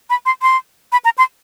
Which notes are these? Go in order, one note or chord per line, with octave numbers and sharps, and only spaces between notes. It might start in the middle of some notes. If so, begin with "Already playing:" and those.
B5
C6
C6
B5
A#5
C6